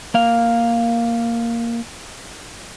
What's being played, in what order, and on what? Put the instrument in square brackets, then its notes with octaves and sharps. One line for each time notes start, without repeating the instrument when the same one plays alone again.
[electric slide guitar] A#3 F5